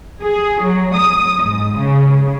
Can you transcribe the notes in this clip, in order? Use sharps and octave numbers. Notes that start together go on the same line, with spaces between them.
G#4
F#3
D#6
G#2
C#3